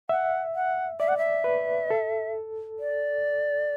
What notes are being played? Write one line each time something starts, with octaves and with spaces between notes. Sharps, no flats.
E5 F#5
F#5
D5 E5
F#5
E5
B4
A4
D5